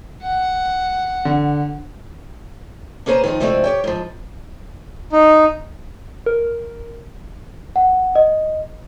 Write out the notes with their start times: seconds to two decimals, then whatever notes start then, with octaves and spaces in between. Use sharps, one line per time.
0.23 F#5
1.25 D3
3.06 A#3 C#4 G#4 B4 C5 A#5
3.24 D#3 F3 C4 C#4 D#4
3.40 C3 F3 G#3 A3 C4 D4
3.64 G4 C#5 G5
3.84 G#2 F3
5.12 D#4
6.26 A#4
7.76 F#5
8.15 D#5